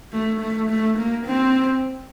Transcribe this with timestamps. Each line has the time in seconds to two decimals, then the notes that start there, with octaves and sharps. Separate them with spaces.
0.13 A3
0.41 A3
0.70 A3
0.98 A#3
1.26 C4